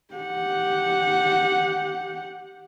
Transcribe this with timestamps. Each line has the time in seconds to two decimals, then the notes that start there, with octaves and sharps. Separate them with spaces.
0.15 G4 F#5